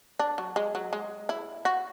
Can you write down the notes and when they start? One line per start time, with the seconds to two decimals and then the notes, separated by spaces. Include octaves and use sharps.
0.19 D4
0.38 F#3
0.56 G#3
0.75 F#3
0.93 G#3
1.29 E4
1.65 F#4